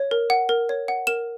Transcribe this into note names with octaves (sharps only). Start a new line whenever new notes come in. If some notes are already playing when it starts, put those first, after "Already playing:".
Already playing: C#5
A#4
F#5
A#4
C#5
F#5
A#4 E7